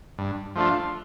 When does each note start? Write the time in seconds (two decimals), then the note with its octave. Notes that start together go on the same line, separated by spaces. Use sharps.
0.18 G2
0.56 F3 A3 D4 F4